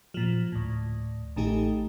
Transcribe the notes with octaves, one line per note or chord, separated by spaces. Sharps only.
A#2 F3
D2 A2
A1 D#3 A3 D#4 G4